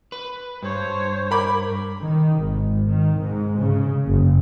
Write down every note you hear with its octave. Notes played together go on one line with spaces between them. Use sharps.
B4
G2 C5 C#5
A#4 B5 D6
D#3
G#1
D#3
G#2
C#3
F#1